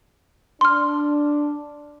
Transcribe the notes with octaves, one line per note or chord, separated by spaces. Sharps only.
D4 C6 F6